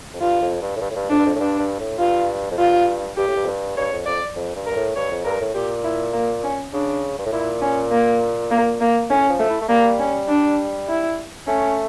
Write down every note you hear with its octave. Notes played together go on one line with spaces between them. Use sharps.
F2
G2 F4
F2
G2
A2
G2
A2
G2
F2 D4
G2
F2
A2
G2 D4
G2
A2
G2 F4
F2
G2 F4
G2 G4
A2
G2
F2
G2
G2 C#5
F2
F2 D5
F2
G2
A#4
G2
A2
G2 C#5
F2
G2 A#4
A2
A#2 G4
E4
A#3
C#4
C#3 D4
G2
A2
A#2 E4
C#4
A#3
A#3
A#3
A2 C#4
F3
A3
E4
A3
G3 A#3
C#4
D4
E4
A3 C#4